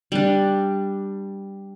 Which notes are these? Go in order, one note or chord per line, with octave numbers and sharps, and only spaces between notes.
G3 D4